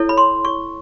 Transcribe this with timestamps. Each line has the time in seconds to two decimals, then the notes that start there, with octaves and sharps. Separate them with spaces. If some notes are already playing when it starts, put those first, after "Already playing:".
Already playing: E4 A4 C#5
0.09 B5
0.17 C6
0.45 C#6